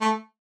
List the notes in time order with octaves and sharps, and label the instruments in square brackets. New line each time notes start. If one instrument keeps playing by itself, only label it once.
[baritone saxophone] A3